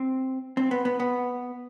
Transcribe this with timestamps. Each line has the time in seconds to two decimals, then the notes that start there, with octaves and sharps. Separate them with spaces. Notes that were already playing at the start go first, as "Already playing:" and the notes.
Already playing: C4
0.57 C4
0.71 B3
0.85 B3
1.00 B3